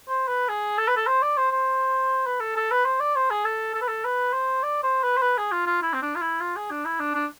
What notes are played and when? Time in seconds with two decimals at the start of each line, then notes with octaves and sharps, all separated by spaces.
0.09 C5
0.28 B4
0.49 G#4
0.78 A4
0.88 B4
0.96 A4
1.07 C5
1.22 D5
1.37 C5
1.52 C5
2.27 B4
2.40 A4
2.56 A4
2.71 B4
2.85 C5
3.00 D5
3.16 C5
3.31 G#4
3.45 A4
3.75 A4
3.82 B4
3.88 A4
4.05 B4
4.33 C5
4.63 D5
4.83 C5
5.03 B4
5.17 C5
5.22 B4
5.38 G#4
5.52 F4
5.66 F4
5.83 E4
5.93 C4
6.02 D4
6.16 F4
6.22 E4
6.41 F4
6.56 G#4
6.71 D4
6.85 E4
7.00 D4
7.15 D4